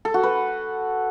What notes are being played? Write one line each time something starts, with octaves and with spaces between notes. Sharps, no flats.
A4
F#4
B4